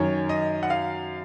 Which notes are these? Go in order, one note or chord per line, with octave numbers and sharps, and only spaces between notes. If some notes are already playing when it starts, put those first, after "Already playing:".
Already playing: F#2 D#3 C#5
D#5
F#5
F5